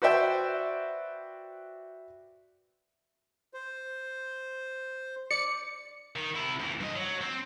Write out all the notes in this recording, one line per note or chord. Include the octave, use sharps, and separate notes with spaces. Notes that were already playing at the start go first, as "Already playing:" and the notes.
F#4 B4 C5 D5 E5 G5
C5
D5 C#7
D#3
C3 E4
D2 E3
G2 D#5
F#3
C4